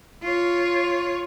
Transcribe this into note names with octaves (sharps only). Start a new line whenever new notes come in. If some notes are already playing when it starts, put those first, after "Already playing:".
F4 C#5